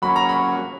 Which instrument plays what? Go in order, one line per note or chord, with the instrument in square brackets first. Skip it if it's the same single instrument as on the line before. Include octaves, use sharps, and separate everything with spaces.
[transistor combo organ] F#3 A#3 C#4 [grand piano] B5
[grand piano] A#5
B5